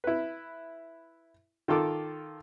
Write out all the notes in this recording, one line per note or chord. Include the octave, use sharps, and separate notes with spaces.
E4 B4
D#3 F4 A4 D6